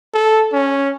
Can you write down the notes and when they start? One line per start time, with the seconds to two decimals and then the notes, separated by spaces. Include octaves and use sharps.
0.14 A4
0.53 C#4